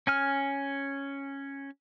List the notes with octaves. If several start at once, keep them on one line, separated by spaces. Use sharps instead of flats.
C#4 G#5 F6